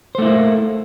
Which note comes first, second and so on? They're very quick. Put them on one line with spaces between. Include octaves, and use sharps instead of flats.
C5 A3 E4 A#3